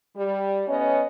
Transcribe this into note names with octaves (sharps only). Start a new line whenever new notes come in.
G3
A2 B3 C#4 C#5 D#5